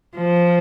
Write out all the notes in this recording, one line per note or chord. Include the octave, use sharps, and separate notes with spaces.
F3